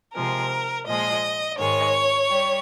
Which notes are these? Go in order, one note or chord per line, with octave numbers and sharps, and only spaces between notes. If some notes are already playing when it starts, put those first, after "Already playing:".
C3 F3 G#3 A#4
A#2 F3 G#3 D#5
G#2 D#3 G#3 C#5
G3